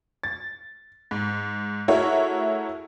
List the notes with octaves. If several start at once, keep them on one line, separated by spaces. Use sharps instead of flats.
A6
G#2
A3 E4 F#4 G#4 A#4 C#5